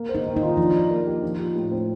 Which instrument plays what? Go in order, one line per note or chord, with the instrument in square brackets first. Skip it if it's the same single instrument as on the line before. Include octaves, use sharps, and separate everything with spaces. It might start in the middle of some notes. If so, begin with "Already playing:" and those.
Already playing: [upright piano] A#3
C5
[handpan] D#4
[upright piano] D#3
[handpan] D#4
[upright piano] F4
[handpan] F3 [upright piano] D4
[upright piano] D5
A#3
G4
F3
G4
A2
C4